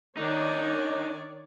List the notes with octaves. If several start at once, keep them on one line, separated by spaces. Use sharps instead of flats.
D#3 D4 D#4 C#5 D5